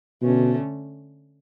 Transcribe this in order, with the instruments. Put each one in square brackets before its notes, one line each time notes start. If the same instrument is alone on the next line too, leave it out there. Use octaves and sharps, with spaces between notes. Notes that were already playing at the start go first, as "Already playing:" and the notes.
[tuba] B2 [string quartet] D3 A3 C#4